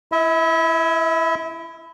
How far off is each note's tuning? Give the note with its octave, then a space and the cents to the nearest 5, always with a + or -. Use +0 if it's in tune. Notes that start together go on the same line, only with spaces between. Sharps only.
E4 +15 E5 -35